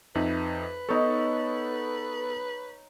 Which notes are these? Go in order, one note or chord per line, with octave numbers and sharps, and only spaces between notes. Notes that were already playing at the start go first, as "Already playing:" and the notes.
F2 D#4 B4 E5
B3 D#4 A4 C#5